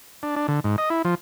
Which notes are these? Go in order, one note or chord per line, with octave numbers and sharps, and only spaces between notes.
D4
D4
D3
G#2
D#5
E4
F3